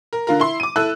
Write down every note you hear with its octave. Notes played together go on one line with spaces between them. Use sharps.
A#4
D3 F4 A#4
E4 C6
D6 D#7
E4 A4 E6 F#6